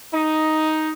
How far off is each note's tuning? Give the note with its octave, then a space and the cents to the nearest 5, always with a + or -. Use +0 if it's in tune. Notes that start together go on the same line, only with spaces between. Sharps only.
D#4 +5